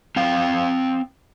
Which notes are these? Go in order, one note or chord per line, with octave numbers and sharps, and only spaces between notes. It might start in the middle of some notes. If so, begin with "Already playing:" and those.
C4 F5 G5